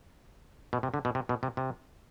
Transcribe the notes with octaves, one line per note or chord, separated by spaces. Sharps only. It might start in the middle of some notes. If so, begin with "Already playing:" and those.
B2
C3
D3
B2
C3
B2
C3
C3